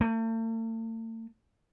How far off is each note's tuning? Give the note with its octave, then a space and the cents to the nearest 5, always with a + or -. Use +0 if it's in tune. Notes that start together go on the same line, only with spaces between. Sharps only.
A3 +45